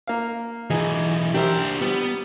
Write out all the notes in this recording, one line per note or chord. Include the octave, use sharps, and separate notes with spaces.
A#3 F5
B1 E3 D#4 G#4
D4 G4 A#4 C5 E5
G3 B3